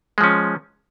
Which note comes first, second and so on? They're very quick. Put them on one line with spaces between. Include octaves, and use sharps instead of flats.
G#3 F3 C#4